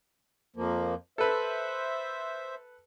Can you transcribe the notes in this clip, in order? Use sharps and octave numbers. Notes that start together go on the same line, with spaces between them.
F2 F3 A#3
A4 B4 C5 E5